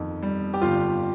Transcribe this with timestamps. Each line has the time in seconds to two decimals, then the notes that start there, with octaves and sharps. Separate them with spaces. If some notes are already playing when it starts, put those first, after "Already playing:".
Already playing: G1 F2 D#3
0.23 G3
0.54 G4
0.62 G1 F4